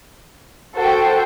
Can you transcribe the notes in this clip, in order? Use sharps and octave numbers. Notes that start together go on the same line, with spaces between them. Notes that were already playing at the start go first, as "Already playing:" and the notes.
F#4 A4 C5 G5